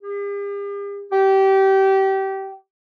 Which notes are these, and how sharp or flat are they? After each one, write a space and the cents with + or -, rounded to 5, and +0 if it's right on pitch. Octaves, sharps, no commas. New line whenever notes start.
G4 +45
G4 -25